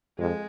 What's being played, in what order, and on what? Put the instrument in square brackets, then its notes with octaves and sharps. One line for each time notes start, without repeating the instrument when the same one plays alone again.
[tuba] F2 [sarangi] G#3